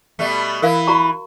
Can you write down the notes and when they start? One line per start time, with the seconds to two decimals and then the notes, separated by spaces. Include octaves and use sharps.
0.19 B2 G3 A3
0.62 E3 E4 A#4 F5
0.87 F#4 A#5 C#6